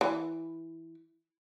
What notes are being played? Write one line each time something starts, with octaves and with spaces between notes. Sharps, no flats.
E3